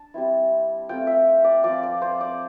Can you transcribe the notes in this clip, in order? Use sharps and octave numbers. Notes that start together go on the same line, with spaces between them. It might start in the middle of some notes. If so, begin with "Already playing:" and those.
Already playing: D4 A5
G3 C4 E4
A3 C4 F4 G5
E5
D5
F3 C4 F4 D5
D5
C5
D5